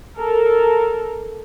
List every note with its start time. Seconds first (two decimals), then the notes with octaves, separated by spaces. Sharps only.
0.18 A4 A#4